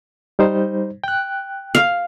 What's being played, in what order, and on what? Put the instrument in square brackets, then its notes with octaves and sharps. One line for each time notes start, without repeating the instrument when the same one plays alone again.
[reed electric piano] G3 D#4 C5
G5 F#6
[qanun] F5